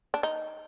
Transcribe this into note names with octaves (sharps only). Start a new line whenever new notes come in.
D4
D#4